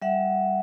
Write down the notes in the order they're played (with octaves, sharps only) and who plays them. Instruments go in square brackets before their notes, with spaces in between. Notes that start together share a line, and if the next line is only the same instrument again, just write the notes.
[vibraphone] G3 E5 F#5